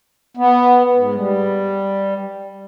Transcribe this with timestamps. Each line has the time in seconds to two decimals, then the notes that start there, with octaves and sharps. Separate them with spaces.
0.37 B3
0.96 G#2
1.16 G3